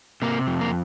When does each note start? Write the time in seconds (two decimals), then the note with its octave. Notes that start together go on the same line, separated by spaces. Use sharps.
0.22 C3 A#3
0.47 F2
0.61 A#3